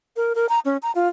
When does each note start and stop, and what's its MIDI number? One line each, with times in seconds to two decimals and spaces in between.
0.16 0.33 70
0.35 0.49 70
0.49 0.60 82
0.65 0.77 61
0.83 0.92 82
0.95 1.08 65